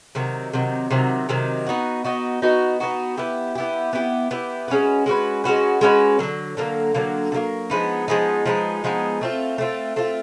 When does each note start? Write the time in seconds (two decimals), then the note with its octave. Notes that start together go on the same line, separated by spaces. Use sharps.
0.15 C3 D#3 F#3
0.53 C3 D#3 F#3
0.91 C3 D#3 F#3
1.29 C3 D#3 F#3
1.67 B3 D#4 F#4
2.04 B3 D#4 F#4
2.42 B3 D#4 F#4
2.80 B3 D#4 F#4
3.17 B3 E4 G4
3.55 B3 E4 G4
3.93 B3 E4 G4
4.31 B3 E4 G4
4.68 G#3 C#4 F#4 B4
5.06 G#3 C#4 F#4 B4
5.44 G#3 C#4 F#4 B4
5.81 G#3 C#4 F#4 B4
6.19 D3 F#3 A#3
6.57 D3 F#3 A#3
6.94 D3 F#3 A#3
7.32 D3
7.34 F#3 A#3
7.70 F3 G#3 B3 D#4
8.08 F3 G#3 B3 D#4
8.46 F3 G#3 B3 D#4
8.84 F3 G#3 B3 D#4
9.21 A3 C4 F4
9.58 A3 C4 F4
9.96 A3 C4 F4